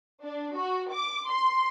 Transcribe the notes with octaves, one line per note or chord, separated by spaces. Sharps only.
D4
F#4
D6
C6